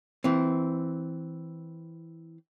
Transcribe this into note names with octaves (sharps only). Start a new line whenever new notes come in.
E3 C4